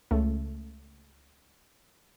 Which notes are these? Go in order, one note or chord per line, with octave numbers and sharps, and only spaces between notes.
C#2 A3